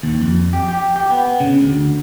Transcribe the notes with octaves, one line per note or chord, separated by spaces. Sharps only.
D#2
F2
G4
G4
G4
B3
C#3
D2